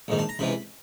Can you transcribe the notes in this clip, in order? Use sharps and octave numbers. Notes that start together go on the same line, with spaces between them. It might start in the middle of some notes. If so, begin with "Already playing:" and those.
A#1 G#2 D#3
A5
A#5
C#2 C3 E3 B5